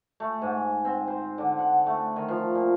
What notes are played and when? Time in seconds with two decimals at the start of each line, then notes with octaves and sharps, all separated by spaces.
0.20 A3
0.42 G#2
0.85 C4
1.08 C5
1.38 D3
1.58 F#5
1.86 A3
2.16 D#3
2.28 F3
2.55 A#2